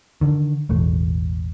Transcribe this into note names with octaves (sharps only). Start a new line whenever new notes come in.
D3 D#3
E1 A1 A3